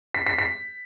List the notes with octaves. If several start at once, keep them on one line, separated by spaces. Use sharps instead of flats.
B6
B6
B6